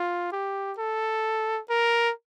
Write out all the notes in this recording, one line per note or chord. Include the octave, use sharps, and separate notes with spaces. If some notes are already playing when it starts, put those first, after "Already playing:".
Already playing: F4
G4
A4
A#4